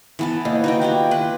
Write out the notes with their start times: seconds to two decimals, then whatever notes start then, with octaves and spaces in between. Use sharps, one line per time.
0.19 E3 B3 A5
0.45 D#2
0.64 D#4 F#4 G5
0.81 E4 F4 G4
1.11 B4